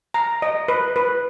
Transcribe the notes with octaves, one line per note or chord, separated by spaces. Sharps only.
A#5
D#5
B4
B4